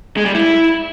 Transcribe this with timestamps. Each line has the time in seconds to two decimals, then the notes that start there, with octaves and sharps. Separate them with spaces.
0.17 G#3
0.26 G3
0.35 E4